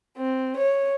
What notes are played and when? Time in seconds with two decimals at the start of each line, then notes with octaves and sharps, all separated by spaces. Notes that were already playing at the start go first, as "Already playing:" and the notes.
0.18 C4
0.57 C#5